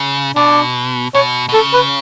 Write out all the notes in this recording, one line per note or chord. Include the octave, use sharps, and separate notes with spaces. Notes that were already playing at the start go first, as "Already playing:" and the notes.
Already playing: C#3
B2 D4
B2 C#5
B2
C#3 A4
B4